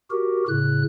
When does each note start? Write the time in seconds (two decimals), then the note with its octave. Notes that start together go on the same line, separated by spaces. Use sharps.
0.11 F#4 G4 A#4
0.48 A2 C#3 F#6